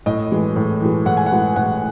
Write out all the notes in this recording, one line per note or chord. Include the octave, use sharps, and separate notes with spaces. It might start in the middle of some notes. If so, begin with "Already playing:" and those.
A2 D#5
E3 G#3
A2
E3 G#3
A2 F#5
G#5
F#5
E3 G#3
A2 F#5